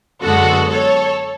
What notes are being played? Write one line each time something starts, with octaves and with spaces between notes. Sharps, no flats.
F#2 D3 G#3 B3 F#4 A4
A4 C#5